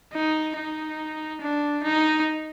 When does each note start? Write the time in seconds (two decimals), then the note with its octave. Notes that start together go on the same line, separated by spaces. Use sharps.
0.14 D#4
0.57 D#4
1.41 D4
1.84 D#4